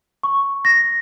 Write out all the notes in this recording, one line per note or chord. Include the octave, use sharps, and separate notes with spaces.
C#6
A#6